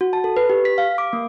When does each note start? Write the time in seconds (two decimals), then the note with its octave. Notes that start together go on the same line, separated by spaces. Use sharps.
0.01 F#4
0.13 A5
0.24 A4
0.37 B4
0.50 G4
0.65 B6
0.78 F5
0.98 D6
1.13 A#3